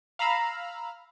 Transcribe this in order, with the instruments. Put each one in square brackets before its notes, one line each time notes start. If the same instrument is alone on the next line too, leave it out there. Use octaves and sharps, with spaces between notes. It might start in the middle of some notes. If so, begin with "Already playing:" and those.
[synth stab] F5 A#5 B5 E6 F6